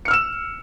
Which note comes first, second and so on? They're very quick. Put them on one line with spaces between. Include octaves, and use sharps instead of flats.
C#7 F6 E6 E7